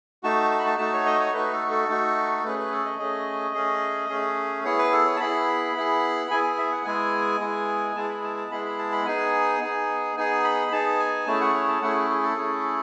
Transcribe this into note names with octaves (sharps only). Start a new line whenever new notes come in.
A3 D#4 F#4 A5
A5
B5
A5
A3 D#4 F#4 A5
C#5
D#5
C#5
A3 D#4 F#4 B4
A4
A4
A3 D#4 F#4
A3 C#4 G#4 B4
B4
A4
D#5
A3 C#4 G#4 D#5
A3 C#4 G#4
A3 C#4 G#4
B3 E4 G#4 C#5
B4
A4
C#5
A5
B3 E4 G#4 B5
B3 E4 G#4
B3 E4 G#4 G#5
G#5
E5
F#5
G#3 B3 E4 G#4 G#5
G#3 B3 E4 G#4
G#3 B3 E4 G#4 A5
B5
A5
A5
G#3 B3 E4 G#4 B5
B5
A5
B5
B3 D#4 G#4 G#5
B3 D#4 G#4
B3 D#4 G#4 G#5
B5
B3 D#4 G#4 A5
G#5
A3 C#4 E4 G#4 A5
F#5
C#5
A5
A3 C#4 E4 G#4 F#5
G#4
A4
A3 C#4 E4 G#4